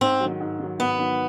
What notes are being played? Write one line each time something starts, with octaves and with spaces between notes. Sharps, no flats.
G#2 C4
F#3
D#3
G#2
D#3 F#3
G#2 B3
D#3 F#3